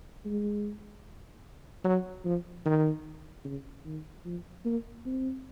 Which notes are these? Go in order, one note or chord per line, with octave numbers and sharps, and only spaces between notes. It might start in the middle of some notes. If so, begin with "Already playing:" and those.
G#3
F#3
F3
D#3
C#3
D#3
F3
A#3
C4